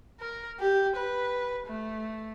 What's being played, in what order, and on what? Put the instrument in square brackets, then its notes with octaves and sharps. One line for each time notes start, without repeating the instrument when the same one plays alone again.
[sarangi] A#4
G4
B4
A3